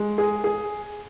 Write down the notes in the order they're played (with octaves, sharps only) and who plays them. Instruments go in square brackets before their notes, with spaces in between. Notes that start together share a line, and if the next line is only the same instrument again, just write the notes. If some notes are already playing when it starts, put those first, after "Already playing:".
Already playing: [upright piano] G#3
G#4
G#4